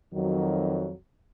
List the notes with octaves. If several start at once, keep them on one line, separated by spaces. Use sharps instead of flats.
F2 D#3 F#3